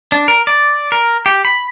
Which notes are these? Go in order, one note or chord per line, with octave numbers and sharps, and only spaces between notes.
D4
A#4
D5
A#4
G4
B5